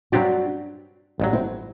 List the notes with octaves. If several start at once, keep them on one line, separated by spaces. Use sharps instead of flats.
G2 F#3 C4 D4 F#4 G4 D5
A1 G2 F#3
C4 E4